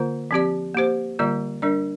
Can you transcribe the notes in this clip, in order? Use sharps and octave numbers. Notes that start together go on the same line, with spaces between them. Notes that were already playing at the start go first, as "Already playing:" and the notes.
Already playing: D3 A#3 F4 C5
F3 C4 G4 D5
A#3 G4 C5
D3 G3 A#3 F4 D5
G3 D4 A#4 D5